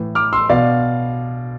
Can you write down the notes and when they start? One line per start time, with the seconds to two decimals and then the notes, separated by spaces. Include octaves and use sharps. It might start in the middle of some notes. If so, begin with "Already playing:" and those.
Already playing: A2 E3
0.15 D6 F6
0.33 C6 E6
0.49 B2 D5 F5